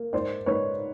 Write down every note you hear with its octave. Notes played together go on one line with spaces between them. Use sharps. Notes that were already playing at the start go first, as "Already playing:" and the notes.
Already playing: A#3
G#2 C5 D5
G#2 B4 C#5